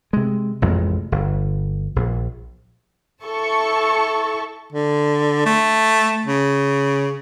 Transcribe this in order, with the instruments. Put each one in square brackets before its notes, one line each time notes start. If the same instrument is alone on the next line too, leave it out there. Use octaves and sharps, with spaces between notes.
[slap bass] C3 G#3
A1 F2 C3 G#3
G1
A#1
[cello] E4 A4 [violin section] A5 C#6
[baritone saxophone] D3
A3
C#3